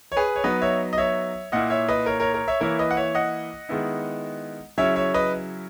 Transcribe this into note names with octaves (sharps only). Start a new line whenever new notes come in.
C#5
G#4 B4
C#5
F#3 B3 D#4 B4 D#5
C#5 E5
D#5
C#5 E5
A#2 A#3 E4 D#5 F#5
C#5 E5
B4 D#5
A#4 C#5
A#4 C#5
A#4 C#5
C#5 E5
E3 A#3 E4 A#4 C#5
B4 D#5
F#5
C#5 E5
D#5 F#5
D#3 G#3 B3 E4
C#3 F#3 C#4 E4 C#5 E5
C#5 E5
B4 D#5